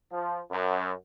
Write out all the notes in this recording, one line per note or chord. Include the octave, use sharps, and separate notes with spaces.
F3
F#2